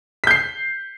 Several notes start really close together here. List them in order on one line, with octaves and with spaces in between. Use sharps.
B6 G6 C7